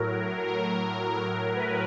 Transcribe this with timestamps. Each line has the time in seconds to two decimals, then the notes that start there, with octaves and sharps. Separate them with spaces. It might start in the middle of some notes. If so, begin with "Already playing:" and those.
Already playing: A2 F#3 A#4
0.47 A#4
1.56 B4